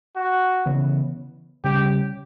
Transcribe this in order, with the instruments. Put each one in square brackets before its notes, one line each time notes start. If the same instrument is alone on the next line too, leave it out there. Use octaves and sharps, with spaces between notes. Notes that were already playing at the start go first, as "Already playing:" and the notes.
[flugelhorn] F#4
[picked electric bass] C#3 E3 B3
[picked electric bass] C#3 G3 C#4 [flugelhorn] G4